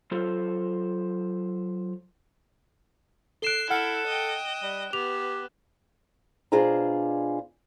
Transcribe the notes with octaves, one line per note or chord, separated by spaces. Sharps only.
F#3 F4 A4 C5
A4 F#6 C7 D7 E7 G7
E4 A4 F#5 F6
D#5 G5
G3
B3 G4 F7
B2 D4 F4 G#4 C5 A#5